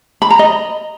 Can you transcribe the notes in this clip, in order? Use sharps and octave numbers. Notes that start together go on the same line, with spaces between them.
B5
A#5
D#5